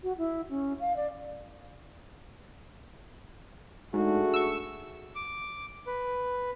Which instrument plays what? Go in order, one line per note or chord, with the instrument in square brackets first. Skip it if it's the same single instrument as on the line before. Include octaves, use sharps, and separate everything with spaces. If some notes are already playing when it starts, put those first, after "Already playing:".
[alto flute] F#4
E4
C#4
F5
D5
[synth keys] G#2 [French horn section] A3 D4 G#4 [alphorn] F#4
[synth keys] C#6 E6
[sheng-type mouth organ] D6
B4